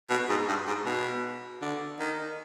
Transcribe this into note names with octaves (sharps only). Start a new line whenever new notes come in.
B2
G#2
G2
G#2
B2
D3
D#3